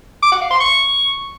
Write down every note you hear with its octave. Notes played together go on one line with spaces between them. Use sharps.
D6
F#5
F5
C6
C#6